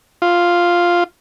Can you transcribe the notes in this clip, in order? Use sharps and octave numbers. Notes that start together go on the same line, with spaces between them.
F4